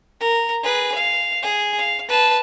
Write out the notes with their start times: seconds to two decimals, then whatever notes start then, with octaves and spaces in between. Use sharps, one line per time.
0.20 A#4
0.63 G#4 B4
0.95 F5
1.43 G#4
1.78 F5
2.08 B4 A5